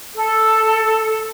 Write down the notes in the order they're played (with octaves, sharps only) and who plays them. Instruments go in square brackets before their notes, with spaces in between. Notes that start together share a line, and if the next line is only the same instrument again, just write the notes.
[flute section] A4